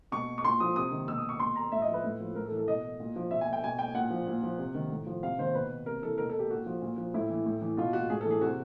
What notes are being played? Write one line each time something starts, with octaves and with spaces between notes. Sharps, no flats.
B2 C#6
C#6
A#2 C6
F3 D#6
C3 D#6
D#3
B2 E6
D#6
C#6
B2 C6
A#5
A2 E5
D#5
F3
B4
A2
F3
A2 A#4
A4
E3
A4
B2 D#5
A#2
F3
B2 E5
G#5
G5
B2 G#5
G5
A#2 F#5
F3
A#2
F3
C3
D#3
A2
F3
C3 F5
D#3 C5
B2 B4
C3 A#4
E3 A4
B2 A#4
A4
G4
A#2 F#4
F3
A#2
F3
A2 E4
E3
A2
E3
B2 F4
F#4
A2 G#4
A4
E3 G#4
C3 F#4